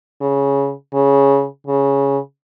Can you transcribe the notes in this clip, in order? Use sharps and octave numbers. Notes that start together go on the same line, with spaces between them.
C#3
C#3
C#3